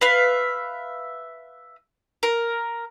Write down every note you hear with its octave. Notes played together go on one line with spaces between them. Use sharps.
B4 E5 F5
A#4